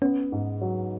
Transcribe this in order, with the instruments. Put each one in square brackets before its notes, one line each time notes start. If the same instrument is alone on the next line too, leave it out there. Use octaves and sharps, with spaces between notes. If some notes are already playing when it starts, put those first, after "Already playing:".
[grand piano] B3 [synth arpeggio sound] C#4
[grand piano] G#2
F#3